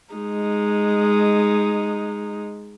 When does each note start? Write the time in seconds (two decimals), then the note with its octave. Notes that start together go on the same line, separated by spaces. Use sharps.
0.14 G#3 D#4